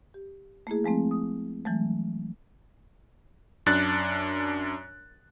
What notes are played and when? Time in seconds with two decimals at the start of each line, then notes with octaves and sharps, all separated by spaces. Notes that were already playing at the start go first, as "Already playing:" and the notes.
0.14 G4
0.67 A3 A#3 E4 G#4
0.84 F3 G#3 A3 C4
1.11 D#6
1.65 E3 F#3 G#3 A3
3.66 F#2 D4 F#6 A6